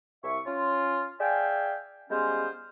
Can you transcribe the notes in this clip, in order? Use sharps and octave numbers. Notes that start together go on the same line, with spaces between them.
C2 E5 C#6
C#4 F4
G#4 D5 E5 F5 G5 G#5
G3 G#3 B3 C#4 F4 C5